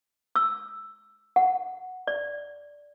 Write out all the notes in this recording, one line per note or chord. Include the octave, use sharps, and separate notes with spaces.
E6
F#5
D5